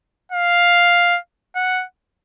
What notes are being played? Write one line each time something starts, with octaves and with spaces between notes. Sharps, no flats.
F5
F#5